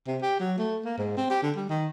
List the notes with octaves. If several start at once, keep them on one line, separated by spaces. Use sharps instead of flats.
C3
G4
F#3
A3
A#3
G#2
C4
G4
D3
G3
D#3